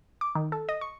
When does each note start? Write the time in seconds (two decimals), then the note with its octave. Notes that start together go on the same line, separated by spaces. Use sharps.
0.21 D6
0.35 D#3
0.52 A4
0.69 D#5
0.81 C#6